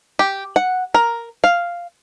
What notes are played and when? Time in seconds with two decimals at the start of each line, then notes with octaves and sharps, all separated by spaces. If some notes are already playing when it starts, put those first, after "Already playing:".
0.19 G4
0.56 F#5
0.94 A#4
1.44 F5